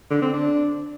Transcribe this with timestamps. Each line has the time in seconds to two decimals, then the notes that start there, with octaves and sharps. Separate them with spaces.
0.10 D3
0.22 C4
0.33 D4